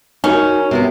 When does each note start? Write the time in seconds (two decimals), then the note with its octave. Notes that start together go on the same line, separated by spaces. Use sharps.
0.24 C#4 D#4 F#4 A#4 C#5
0.71 C3 B3 E4